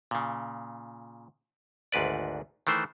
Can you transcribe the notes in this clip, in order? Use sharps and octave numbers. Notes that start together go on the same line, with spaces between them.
A#2 C#3
G#1 D2 G#2 B4 D5
D#3 E3 A3 C5